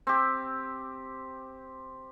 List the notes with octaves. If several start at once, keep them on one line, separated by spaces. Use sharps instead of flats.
C4 G4